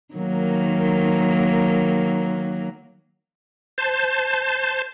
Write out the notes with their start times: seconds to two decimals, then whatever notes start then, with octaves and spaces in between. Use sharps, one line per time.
0.14 D#3 F#3 A#3
3.78 C5 A5